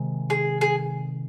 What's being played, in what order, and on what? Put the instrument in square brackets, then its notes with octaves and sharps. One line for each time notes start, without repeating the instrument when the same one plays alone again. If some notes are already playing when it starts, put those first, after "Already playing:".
Already playing: [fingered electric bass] C3 D#3 G#3
[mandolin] G#4
G#4